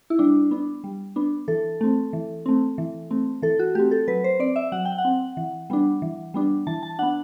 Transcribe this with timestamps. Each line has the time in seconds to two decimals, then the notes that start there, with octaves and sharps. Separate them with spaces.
0.10 E4
0.19 G3 D4
0.51 B3 D4
0.84 G3
1.16 B3 D4
1.48 E3 A4
1.81 A3 C4
2.13 E3
2.46 A3 C4
2.78 E3
3.11 A3 C4
3.42 E3 A4
3.59 F#4
3.75 A3 C4 G4
3.91 A4
4.08 F#3 B4
4.24 C5
4.39 C4 D5
4.56 E5
4.72 F#3 F#5
4.85 G5
4.98 F#5
5.05 C4
5.37 E3
5.70 G3 B3 D4
6.02 E3
6.34 G3 B3 D4
6.67 E3 A5
6.83 A5
6.99 B3 D4 F#5